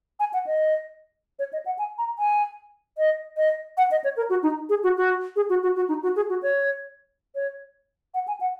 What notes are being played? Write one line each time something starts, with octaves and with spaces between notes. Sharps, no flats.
G#5
F#5
D#5
C#5
D#5
F#5
G#5
A#5
G#5
D#5
D#5
F#5
D#5
C#5
A#4
F#4
D#4
G#4
F#4
F#4
G#4
F#4
F#4
F#4
D#4
F#4
G#4
F#4
C#5
C#5
F#5
G#5
F#5